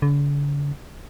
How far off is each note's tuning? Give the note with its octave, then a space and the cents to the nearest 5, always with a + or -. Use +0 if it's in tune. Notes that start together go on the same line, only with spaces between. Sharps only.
D3 -45